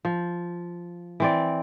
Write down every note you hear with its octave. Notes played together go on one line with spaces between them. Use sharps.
F3
E3 C4 D5